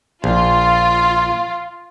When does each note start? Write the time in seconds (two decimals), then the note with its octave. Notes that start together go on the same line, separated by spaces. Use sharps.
0.24 A#1 F4